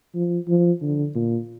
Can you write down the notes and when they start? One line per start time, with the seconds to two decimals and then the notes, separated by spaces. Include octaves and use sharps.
0.15 F3
0.48 F3
0.82 D3
1.15 A#2